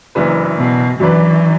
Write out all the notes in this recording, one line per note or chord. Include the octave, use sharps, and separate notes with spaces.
F#1 F#2 E3 D4 B4
B2
F#2 E3 F#3 D4 B4 D5